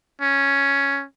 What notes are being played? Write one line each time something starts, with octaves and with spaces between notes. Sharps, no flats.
C#4